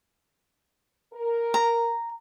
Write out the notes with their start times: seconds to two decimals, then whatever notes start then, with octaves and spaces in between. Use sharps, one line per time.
1.13 A#4
1.54 A#5